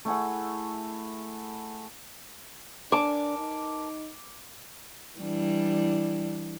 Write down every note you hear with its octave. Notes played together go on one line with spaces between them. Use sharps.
A3 E4 G#4 F#5
D4 A#4 G#5 A5 D6
D#4
E3 G3 D4